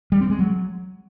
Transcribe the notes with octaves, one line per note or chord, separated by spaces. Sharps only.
G3
C4
G#3
F#3